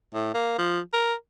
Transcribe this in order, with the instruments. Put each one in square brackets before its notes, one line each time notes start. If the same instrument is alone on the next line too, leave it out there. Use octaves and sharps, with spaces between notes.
[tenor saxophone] A2
A#3
F3
A#4